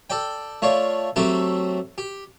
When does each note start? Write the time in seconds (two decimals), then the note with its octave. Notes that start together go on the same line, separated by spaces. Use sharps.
0.10 A4 D5 G5
0.62 A3 F4 C#5 D5
1.16 F#3 A3 C4 G4 A4
1.98 G4